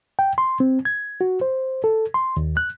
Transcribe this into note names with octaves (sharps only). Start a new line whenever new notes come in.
G5
C6
C4
G#6
F#4
C5
A4
C6
D#2
F#6